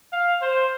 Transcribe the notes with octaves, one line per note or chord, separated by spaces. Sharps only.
F5
C5